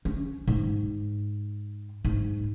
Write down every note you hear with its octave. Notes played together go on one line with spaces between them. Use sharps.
C#4
G#2
G#2